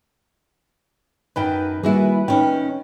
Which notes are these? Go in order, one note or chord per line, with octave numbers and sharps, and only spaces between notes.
F#2 D#3 B4 G5
D#3 G3 A#3 E4 F#4 G#4
D#3 C#4 G5